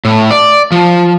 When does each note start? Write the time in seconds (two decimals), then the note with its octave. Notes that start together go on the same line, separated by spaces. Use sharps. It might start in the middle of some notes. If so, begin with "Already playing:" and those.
0.05 A2
0.31 D5
0.72 F3